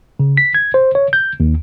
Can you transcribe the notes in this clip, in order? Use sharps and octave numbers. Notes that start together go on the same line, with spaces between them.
C#3
B6
G#6
C5
C#5
G6
D#2